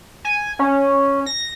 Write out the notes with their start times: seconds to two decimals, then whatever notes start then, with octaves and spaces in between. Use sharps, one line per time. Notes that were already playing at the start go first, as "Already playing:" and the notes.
0.25 G#5
0.59 C#4
1.26 A#6